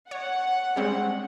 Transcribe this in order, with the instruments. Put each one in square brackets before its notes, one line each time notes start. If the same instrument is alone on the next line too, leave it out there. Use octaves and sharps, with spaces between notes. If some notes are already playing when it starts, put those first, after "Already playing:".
[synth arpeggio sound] C#5 [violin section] F#5
[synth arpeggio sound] G3 C4 C#4 [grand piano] G#3